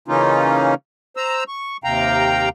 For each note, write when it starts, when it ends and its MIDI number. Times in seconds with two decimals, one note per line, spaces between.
0.08 0.75 49
0.08 0.75 52
0.08 0.75 58
0.08 0.75 61
0.08 0.75 63
0.08 0.75 65
1.17 1.44 72
1.17 1.44 82
1.17 1.44 88
1.48 1.77 85
1.84 2.49 39
1.84 2.49 48
1.84 2.49 77
1.84 2.49 79
1.84 2.49 82